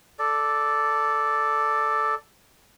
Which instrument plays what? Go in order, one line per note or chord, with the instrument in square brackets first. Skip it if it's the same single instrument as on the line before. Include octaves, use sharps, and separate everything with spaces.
[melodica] A4 D5